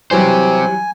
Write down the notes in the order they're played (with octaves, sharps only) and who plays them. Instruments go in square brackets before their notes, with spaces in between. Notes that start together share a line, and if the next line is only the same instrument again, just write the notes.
[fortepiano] E3 F#3 G3 [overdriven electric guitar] G4 C5 [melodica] G#5